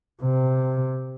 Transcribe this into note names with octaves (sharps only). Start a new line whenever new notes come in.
C3